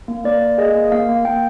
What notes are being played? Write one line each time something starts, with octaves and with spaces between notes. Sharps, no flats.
A#3
A#3 D5
A#3
G#4 D#5
A#3
A#3 F5
A#3
A#3 G5